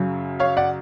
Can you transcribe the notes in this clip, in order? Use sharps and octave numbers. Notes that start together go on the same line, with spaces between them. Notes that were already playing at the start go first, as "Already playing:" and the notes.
Already playing: F#2 C#3 F#3
C#5 F5
D5 F#5